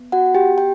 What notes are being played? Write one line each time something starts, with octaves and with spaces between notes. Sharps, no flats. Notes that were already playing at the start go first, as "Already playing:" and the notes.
Already playing: B3
F#4 F#5
G4 G5
G5